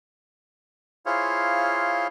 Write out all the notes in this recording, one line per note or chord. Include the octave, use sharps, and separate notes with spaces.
E4 F4 G#4 C5 C#5 F5